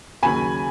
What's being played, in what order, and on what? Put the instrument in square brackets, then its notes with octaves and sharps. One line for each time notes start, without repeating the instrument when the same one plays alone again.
[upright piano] D#2 C#3 F#3 G#5 B5